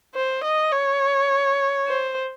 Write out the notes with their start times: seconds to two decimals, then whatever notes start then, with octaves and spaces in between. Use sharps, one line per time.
0.15 C5
0.44 D#5
0.72 C#5
1.88 C5